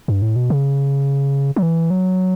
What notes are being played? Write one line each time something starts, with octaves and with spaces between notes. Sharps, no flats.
G2
A2
B2
C#3
F#3
E3
F#3